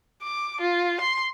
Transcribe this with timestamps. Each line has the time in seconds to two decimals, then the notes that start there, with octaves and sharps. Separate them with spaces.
0.22 D6
0.61 F4
1.01 C6